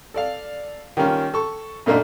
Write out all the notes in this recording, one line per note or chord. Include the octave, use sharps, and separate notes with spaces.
A4 D5 F5
D#3 G3 A#3 C#4 F4
A4 C#6
F#2 A#2 A3 A#3 D4 D#4